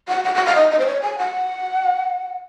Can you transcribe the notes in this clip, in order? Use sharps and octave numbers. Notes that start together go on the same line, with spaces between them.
F#5
F#5
F#5
F5
D#5
D#5
C5
C#5
G#5
F#5